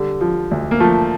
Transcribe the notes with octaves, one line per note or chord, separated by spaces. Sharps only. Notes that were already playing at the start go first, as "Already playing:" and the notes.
Already playing: D3 G3
F3
D2
A#3
F3 A3